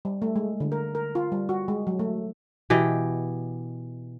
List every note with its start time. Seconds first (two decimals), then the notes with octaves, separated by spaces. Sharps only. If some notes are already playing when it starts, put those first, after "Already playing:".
0.05 G3
0.22 A3
0.36 G#3
0.60 D3
0.72 A#4
0.95 A#4
1.15 F4
1.32 G3
1.49 F#4
1.68 G#3
1.87 F#3
1.99 A3
2.70 B2 E3 G4 D#5